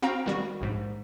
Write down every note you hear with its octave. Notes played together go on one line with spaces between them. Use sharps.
C4 F#4 F5 G5 A#5
D#3 G3 F#4
A#1 G#2